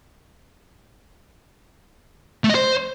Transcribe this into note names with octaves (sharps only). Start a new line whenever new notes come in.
A3
D#5
C5